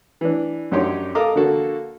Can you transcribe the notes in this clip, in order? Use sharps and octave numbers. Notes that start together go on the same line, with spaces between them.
E3 D4
F#2 D4 D#4 G4 C#5 C6
A4 A#4 D#5 F5 A#5 D6
D3 A#3 F#4 A4